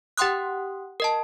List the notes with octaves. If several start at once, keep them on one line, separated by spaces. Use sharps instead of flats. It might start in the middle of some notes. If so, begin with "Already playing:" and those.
G4 F#5 G5 C6 D#6 F#6
A#4 D#5 A5